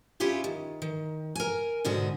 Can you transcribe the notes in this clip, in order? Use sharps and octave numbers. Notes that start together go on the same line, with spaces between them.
C#4 E4 F4 G4 G#4
D#3
D#3
A#4 G#5
G#2 B2 D3 F#4 G#4